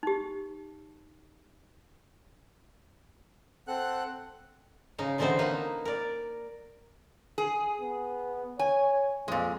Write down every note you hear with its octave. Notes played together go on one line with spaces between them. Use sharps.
D#4 G4
C4 A4 F#5 F#6
C#3 D#4 F5
B2 D3 E3 C4 D#4 C5
A#3 D#4 B4
A#4 D5
G#4
B3
C#5 G#5
F2 A#2 G#3